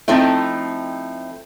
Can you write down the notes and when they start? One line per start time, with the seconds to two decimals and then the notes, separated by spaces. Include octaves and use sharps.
0.08 F3 A3 C4 D#4 E4